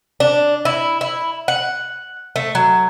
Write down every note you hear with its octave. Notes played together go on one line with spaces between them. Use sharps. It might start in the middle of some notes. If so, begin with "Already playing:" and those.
D4
E4
E4
F#5
A3
F#3